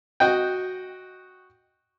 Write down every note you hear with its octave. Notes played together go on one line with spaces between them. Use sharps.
F#4 D#5 G5